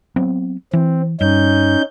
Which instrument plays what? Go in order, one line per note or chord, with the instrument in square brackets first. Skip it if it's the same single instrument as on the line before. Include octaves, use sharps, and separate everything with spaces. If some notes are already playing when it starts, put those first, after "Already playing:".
[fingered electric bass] F#3 B3 C4
[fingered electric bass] E3 [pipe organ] C4
[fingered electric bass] G2 [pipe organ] C#4 D#4 G6